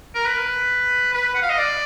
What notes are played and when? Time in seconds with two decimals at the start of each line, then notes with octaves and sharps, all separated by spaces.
0.15 A#4
0.26 B4
1.14 B4
1.34 F#5
1.42 F5
1.49 D#5
1.58 D5